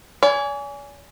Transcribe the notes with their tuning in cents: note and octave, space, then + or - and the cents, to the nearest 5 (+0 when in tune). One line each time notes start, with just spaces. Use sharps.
D5 -45 G#5 +0